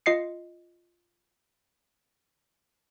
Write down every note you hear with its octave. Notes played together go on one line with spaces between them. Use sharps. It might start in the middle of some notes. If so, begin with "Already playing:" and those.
F4 D#5 C7 C#7